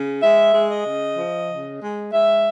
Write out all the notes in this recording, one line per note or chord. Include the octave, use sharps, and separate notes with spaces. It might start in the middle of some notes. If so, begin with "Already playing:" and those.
Already playing: C#3
G#3 E5
G#3
D#5
C#3
F3
C#3
G#3
G#3 E5